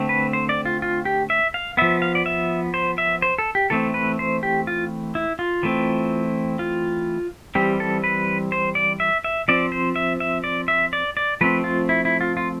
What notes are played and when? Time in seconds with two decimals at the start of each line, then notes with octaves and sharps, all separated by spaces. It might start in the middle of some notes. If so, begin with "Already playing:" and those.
Already playing: D3 A3 C4
0.09 B4
0.33 C5
0.49 D5
0.65 F4
0.82 F4
1.05 G4
1.30 E5
1.54 F5
1.77 F3 B3 E5
2.02 F5
2.15 D5
2.26 E5
2.74 C5
2.98 E5
3.22 C5
3.38 A4
3.55 G4
3.70 E3 A3 C4 A4
3.94 B4
4.19 C5
4.43 G4
4.67 F4
5.15 E4
5.39 F4
5.63 E3 A3 C4
6.59 F4
7.55 E3 G3 C4 G4
7.80 A4
8.04 B4
8.52 C5
8.75 D5
9.00 E5
9.24 E5
9.48 F3 C4 D5
9.72 C5
9.96 E5
10.20 E5
10.44 D5
10.68 E5
10.93 D5
11.17 D5
11.41 F3 A3 C4 B4
11.64 F4
11.89 E4
12.05 E4
12.21 F4
12.37 F4